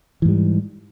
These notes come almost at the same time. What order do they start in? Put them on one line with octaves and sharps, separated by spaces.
E3 G#2 G3